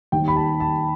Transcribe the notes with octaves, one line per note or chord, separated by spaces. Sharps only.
D#2 D#3 G3 G5
B5
A5
A5